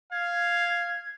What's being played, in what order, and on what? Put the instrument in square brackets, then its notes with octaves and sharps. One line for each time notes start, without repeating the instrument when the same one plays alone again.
[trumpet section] F5 [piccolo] G#6